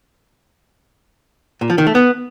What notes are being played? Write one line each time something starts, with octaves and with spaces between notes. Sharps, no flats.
A#2
F3
D#3
A3
B3